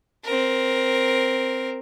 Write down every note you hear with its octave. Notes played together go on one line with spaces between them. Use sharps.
C4 A#4